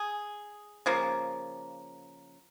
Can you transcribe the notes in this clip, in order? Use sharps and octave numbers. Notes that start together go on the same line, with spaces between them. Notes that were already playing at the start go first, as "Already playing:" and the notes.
Already playing: G#4
C#3 F3 A#3